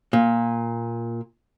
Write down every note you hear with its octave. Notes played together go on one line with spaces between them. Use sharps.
A#2